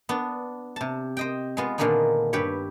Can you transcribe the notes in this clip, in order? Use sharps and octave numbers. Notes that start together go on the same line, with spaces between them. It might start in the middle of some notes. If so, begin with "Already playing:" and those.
B3 D4
C3 A5
C5 D#5 G5
G#3 B3 F4
A#2 D3 D#3 G#3 A#3 B3
G2 G4 B4 C#5